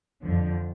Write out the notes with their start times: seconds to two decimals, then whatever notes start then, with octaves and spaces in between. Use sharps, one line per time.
0.22 F2 D3 F3